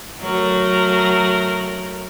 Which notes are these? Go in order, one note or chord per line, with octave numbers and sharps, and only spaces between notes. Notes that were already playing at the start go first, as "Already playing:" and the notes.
F#3 A3 A#4